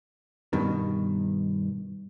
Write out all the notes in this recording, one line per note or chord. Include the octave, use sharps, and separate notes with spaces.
G2 B2 D#3